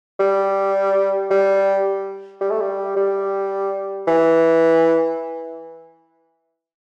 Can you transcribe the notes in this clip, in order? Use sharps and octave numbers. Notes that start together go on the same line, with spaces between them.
G3
G3
G3
A3
G3
G3
E3